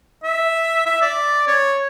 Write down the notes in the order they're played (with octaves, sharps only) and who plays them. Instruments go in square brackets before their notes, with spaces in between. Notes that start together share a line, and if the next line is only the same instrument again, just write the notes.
[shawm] E5
E5
D5
C#5